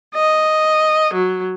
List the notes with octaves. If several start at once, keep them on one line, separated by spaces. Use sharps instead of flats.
D#5
F#3